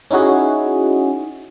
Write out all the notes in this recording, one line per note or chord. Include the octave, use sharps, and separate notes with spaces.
C#4 D#4 E4 F#4 G#4